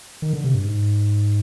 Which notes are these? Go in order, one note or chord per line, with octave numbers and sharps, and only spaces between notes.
D#3
D3
C3
G2
G#2